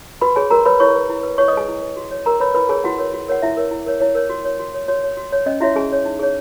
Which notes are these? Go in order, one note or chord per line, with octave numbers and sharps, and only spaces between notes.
F#4 B4 B5
G#4 C#5 G#5
F#4 A#4 A#5
B4 C#5 B5
E4 C#5 C#6
B4
E4
B4
E4 C#5 C#6
D#5 D#6
G#4 B4 G#5
E4
B4
F#4
C#5
F#4 A#4 A#5
B4 C#5 B5
E4 B4 B5
G#4 A#4 C#5 G#5
E4 F#4 F#5
A#4 C#5
F#4
A#4 C#5 F#5
E4 F#4 E5
A#4 C#5
E4
A#4 C#5
E4 C#5
A#4 C#5
F#4
C#5
F#4
C#5
F#4 C#5
C#5
F#4
C#5
C#4 D#5
E4 F#4 C#5 E5
C#4 G#4 G#5
F#4 C#5
D#4
G#4 C#5